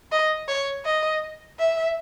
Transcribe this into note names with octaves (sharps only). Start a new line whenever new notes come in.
D#5
C#5
D#5
E5